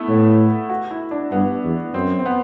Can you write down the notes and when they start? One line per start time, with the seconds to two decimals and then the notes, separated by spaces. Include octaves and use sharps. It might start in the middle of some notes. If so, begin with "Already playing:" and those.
Already playing: A3 B3 E4
0.08 A2
0.70 F#4
0.91 E4
1.11 D4
1.32 G2 B3
1.63 E2
1.94 F#2 C4
2.19 C4
2.26 B3